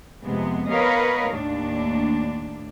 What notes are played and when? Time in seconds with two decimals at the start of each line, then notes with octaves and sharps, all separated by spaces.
0.25 F2 C3 G#3 B3
0.70 B3 A#4 B4 C#5 D#5 F5
1.30 D#2 A2 D4